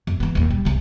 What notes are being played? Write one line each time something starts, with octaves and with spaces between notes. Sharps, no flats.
F2
E3 B3
A#1 D#2
G3
C2 C3